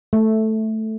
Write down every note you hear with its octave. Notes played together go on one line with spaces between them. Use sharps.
A3